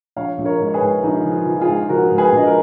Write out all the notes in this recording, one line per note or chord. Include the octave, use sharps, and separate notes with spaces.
A#1 C#5 F5
A#1
A#4 C#5
G#2
C#5
G#4 B4
G#2
A#1 D#4
F3
F4
F3
F4 G#4
G#2
F3 F#4 A#4
G#2
G#4 B4
A#1 D#5
A#4